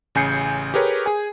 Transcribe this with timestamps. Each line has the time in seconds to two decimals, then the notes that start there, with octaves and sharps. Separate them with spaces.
0.15 A1 C#3 G#5 G6 C7 C#7
0.74 G4 G#4 A#4 B4 C#5
1.06 G#4 G#5